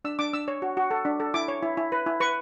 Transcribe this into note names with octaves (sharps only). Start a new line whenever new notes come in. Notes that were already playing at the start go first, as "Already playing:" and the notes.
D4 E6
D4 D6
D4 E6
C#5
F#4
F#4
A4
D4
A4
E4 D6
C#5
E4
E4
B4
E4
B4 C#6